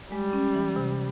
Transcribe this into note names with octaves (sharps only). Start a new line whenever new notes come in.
G3 G#3
C#4
E3
C3